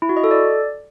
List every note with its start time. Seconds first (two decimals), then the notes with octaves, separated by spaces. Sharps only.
0.02 E4
0.09 F#4
0.17 D#5
0.24 A4
0.31 D5